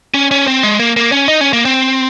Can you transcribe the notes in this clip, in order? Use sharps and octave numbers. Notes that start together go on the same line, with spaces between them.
C#4
C#4
C4
G#3
A#3
A#3
C#4
D#4
C#4
A#3
C4